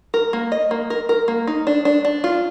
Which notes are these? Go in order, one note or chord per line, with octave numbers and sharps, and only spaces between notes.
A#4
A#3
D#5
A#3
A#4
A#4
A#3
D#4
D4
D4
D4
F4